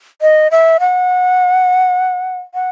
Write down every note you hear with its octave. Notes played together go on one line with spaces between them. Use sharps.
D#5
E5
F#5
F#5